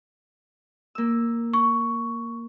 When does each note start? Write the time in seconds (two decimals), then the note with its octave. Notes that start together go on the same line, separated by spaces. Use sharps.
0.95 A#3 E6
1.53 C#6